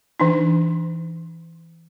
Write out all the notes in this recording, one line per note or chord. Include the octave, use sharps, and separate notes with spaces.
E3 D4 D#4